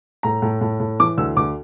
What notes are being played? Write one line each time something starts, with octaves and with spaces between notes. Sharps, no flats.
A2 A#5
A2
A2
A2
E3 D6
D2 E6
D2 D6